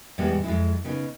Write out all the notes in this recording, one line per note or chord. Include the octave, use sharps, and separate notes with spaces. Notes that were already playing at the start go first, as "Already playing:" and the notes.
E2 A2 E3 G3 G#3 B3
F2 G#3 E4
C#3 B3 D#4